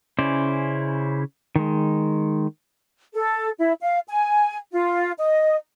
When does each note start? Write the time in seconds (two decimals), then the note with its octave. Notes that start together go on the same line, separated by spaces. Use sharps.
0.19 C#3 C#4 E4 C5 D5
1.56 D#3 G#3
3.14 A4
3.58 E4
3.82 F5
4.08 G#5
4.72 F4
5.18 D#5